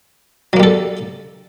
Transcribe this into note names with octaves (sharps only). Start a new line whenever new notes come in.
F#3 G3 A#3 A4